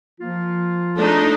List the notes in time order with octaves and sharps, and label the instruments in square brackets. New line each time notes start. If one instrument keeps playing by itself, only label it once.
[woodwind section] F3 A#3 F4
[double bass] A3 [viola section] D4 D#4